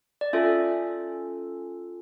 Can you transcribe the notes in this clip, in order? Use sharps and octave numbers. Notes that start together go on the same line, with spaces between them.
D5
C#4 F4 A4 E5